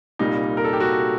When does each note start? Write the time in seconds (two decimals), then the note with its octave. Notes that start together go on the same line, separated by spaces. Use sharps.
0.19 C2 A#2 G3 A#3 D#4
0.57 A#4
0.64 A4
0.73 G4
0.80 F#4